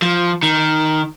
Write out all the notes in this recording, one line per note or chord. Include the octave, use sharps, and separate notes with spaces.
F3
D#3